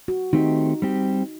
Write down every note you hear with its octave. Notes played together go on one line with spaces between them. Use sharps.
F#4
D#3 A3 C4 D#4 G4
G3 C4 G4